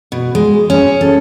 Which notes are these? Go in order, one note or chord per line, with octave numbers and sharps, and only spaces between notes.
B2
G#3
C#4
A4